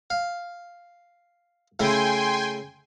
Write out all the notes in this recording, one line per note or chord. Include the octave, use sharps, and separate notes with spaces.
F5
C#3 A3 E4 G5 G#5 C6